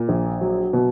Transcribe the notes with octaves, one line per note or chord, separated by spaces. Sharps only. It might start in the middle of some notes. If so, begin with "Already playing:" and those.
Already playing: A#2
A#1
F#3
B2